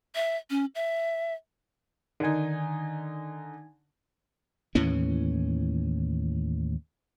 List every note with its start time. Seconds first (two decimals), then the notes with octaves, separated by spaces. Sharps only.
0.15 E5
0.50 C#4
0.75 E5
2.20 D3 D#3 D#4 G#5
4.75 D#2 A2 E3 C#4